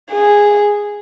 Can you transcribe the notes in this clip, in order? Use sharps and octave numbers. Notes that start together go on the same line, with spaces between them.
G#4